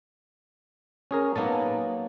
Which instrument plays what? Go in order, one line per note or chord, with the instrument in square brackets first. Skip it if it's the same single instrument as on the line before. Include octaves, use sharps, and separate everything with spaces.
[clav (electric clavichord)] C#4 G#4 A#4
[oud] F#3 A#3 D#4 [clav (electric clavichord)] B3 A5